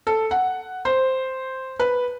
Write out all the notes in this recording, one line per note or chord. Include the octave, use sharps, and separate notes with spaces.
A4
F#5
C5
B4